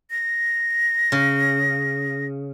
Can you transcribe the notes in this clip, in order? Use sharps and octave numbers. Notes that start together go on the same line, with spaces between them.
A#6
C#3